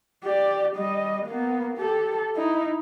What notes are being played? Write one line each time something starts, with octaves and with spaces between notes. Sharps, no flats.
G4 D5
G3 D#5
A#3 B3
G4 A4
D#4 E4